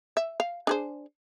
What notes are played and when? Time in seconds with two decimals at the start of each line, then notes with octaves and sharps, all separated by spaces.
0.17 E5
0.40 F5
0.67 D4 G#4 C5